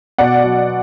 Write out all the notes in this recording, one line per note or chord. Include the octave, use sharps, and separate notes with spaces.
B2 D5 F#5
F#3